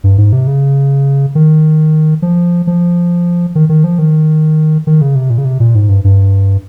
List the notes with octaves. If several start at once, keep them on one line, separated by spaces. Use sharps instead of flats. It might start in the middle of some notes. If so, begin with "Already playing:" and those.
G2
G#2
C3
C#3
D#3
F3
F3
D#3
D#3
F3
D#3
D#3
C#3
C3
A#2
C#3
C3
A#2
G#2
G2
G2